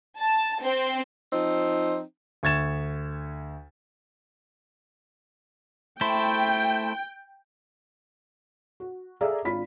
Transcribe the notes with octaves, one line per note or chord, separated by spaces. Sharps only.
A5
C4
F3 C4 D#4
D2 C#6 G#6 A6 E7
A3 E4 C5 G5
F#4
G#4 A4 D5 E5 F5 A#5
G#1 D4 F4 B5 B6